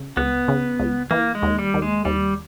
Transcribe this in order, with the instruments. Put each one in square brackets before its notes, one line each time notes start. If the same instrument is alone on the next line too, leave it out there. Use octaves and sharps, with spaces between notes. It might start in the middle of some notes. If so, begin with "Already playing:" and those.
Already playing: [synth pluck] C#3
[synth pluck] C#2 [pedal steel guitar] B3
[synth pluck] C#3
C#2
[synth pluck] E3 [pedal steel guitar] A#3
[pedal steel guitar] G#3
[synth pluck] D#2
[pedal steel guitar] G3
[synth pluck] D#2
[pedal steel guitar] G#3
[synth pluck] D#2 [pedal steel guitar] G3